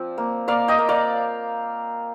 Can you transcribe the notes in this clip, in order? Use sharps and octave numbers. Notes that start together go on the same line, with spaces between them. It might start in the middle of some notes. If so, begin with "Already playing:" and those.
Already playing: F3 C4 D5
A#3
A#3 D5 F5
D#5 G5
A#3
D5 F5